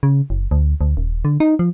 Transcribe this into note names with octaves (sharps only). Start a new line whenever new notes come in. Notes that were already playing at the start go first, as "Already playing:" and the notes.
C#3
F#1
D2
D2
D#1
D3
D#4
F3